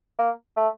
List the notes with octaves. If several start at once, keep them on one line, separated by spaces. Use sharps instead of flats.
A#3
A3